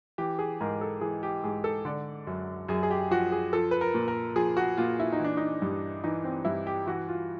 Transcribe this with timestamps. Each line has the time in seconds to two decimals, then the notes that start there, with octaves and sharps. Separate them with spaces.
0.18 E3 G4
0.39 G#4
0.61 G#2 A#4
0.81 A4
1.01 E3 G#4
1.23 G4
1.44 G#2 G#4
1.64 A4
1.85 D3 D5
2.27 F#2
2.69 F#2 G#4
2.83 G#4
2.91 G4
3.11 F3 F#4
3.32 G#4
3.53 F3 A4
3.71 B4
3.81 A#4
3.94 A#2
4.08 A#4
4.36 F3 G#4
4.57 F#4
4.77 A#2 F4
5.00 E4
5.13 D#4
5.19 E3
5.25 D4
5.37 D#4
5.62 G2
6.04 E3 D#4
6.24 C4
6.45 G2 E4
6.67 G4
6.87 E3 F#4
7.09 F4